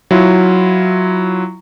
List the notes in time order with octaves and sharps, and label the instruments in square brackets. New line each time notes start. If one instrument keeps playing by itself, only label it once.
[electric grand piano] F#3 E4 F4